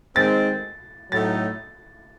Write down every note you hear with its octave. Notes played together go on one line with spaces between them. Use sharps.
D#3 G#3 C4 A6
A2 F#3 A3 D#4 A6